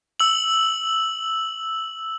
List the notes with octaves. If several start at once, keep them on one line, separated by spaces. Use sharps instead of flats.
E6 F#7